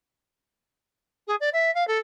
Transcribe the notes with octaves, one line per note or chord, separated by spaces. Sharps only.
G#4
D5
E5
F5
A4